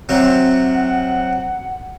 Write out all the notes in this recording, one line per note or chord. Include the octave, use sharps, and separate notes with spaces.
C3 F#3 C4 F#5